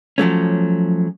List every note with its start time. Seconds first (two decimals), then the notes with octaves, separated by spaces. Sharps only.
0.18 F3 F#3 A3 C#4